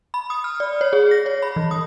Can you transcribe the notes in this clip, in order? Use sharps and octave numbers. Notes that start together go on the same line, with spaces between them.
B5
D#6
F6
D5
C#5
G#4
A#6
C#5
B5
E3
D#6